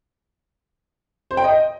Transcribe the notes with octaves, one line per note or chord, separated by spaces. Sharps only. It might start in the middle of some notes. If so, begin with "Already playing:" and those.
C5
G5
D#5